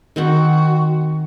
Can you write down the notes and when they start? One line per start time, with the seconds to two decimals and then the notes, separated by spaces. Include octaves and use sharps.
0.16 D#3 C4 F#4 F#5